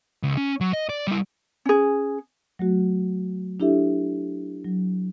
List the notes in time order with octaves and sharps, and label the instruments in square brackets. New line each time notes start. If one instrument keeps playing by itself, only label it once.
[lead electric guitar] C#2
C#4
F#3
D#5
D5
G3 E4
[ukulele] C#4 G#4
[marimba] F#3 A3 F#4
D4 E4 G4 A4 E5
F#3